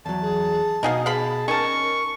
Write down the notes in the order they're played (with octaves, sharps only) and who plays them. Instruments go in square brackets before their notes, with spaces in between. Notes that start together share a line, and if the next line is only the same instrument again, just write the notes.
[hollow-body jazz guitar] E2 F#3 [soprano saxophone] A5
[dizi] G#4
[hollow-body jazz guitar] B2 F#4 [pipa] D#4 G#4 F5 [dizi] F#5
[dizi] G#4 [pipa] F5 B5 [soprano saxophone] A5
[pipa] C#4 A5 [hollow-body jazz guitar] D#4 [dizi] A#4 [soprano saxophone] C#6